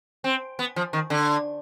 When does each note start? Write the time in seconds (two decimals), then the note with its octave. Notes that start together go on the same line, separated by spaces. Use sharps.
0.24 C4
0.59 B3
0.76 F3
0.93 D#3
1.10 D3